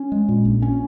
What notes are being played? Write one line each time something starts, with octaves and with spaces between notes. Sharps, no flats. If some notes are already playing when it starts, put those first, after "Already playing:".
Already playing: C#4
G#3
A#2
A#1
C#4